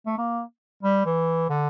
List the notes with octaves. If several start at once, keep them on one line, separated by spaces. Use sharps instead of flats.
A3
A#3
G3
E3
D3